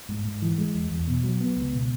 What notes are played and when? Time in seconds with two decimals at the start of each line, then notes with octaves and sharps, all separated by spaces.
0.09 G#2
0.25 G#2
0.42 E3
0.58 G#3
0.75 E2
0.91 E2
1.08 B2
1.24 F#3
1.40 B3
1.57 C#2
1.73 B2